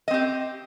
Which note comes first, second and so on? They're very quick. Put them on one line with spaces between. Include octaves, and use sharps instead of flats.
D#5 C4 G4